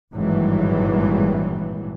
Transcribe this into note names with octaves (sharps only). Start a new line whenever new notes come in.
G#1 G2 A#2 E3 F#3 G3